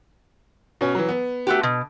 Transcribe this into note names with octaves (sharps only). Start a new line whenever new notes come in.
B2 C#4
E3 F#3
B3
A3 F#4 G4
B2